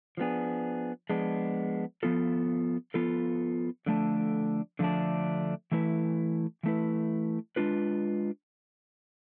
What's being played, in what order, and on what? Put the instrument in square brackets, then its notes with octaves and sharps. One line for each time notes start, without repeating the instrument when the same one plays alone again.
[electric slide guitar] F3 G#3 B3 D4 G#4
F3 G#3 B3 D4 G#4
F3 B3 F4 A4
F3 B3 F4 A4
D3 F3 A3 D4
D3 F3 A3 D4
E3 A3 E4 B4
E3 A3 E4 B4
G#3 D4 F4 B4